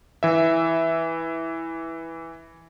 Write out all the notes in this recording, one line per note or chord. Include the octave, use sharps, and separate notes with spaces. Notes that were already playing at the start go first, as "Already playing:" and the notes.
E3 E5